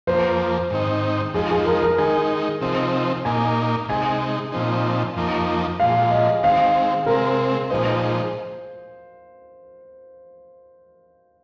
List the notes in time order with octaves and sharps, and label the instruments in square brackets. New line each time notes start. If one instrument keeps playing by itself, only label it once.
[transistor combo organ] F2 F3 A#3 [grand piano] C5
[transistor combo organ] G#2 D#3 C4 D#4
[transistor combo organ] F2 F3 G#3 D#4 [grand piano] G#4
[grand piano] G#4
A#4
A#4
[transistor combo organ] D#3 G#3 D#4 [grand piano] G#5
[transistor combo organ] C3 F3 C4 D#4
[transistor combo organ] A#2 A#3 D#4 [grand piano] G#5
[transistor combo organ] C3 G#3 D#4 [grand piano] G#5
[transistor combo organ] A#2 F3 C4 D#4
F2 F3 A#3 D#4
[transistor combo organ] A#2 F3 G#3 [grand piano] F5
[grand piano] D#5
[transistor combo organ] D#3 G#3 C4 [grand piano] F5
[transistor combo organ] C3 G#3 C4 [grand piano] A#4
[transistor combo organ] A#2 F3 G#3 D#4 [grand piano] C5